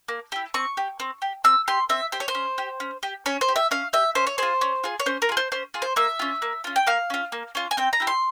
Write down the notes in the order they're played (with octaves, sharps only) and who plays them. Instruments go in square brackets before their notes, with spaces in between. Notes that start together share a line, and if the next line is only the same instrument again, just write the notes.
[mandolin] A#3
E4 G4
C4 C#6
G4
C4
G4
C4 E6
G4 C6
C4 E5
G4 C5
C#5
C5
C#4
G4
C#4
G4
C#4 C#5
C5
G4
E5
C#4 F5
G4 E5
C#4 C5
C#5
F4 G#4 C5
C#4
F4 G#4
C#5
C#4 C5
A#4
F4 G#4
C5
C#4 C5
F4 G#4
C5
A#3 E5
C#4 F4
A#3
C#4 F4
G5
A#3 F5
C#4 F4
A#3
C#4 F4
G#5
C4 G5
A#5
E4 G4
C6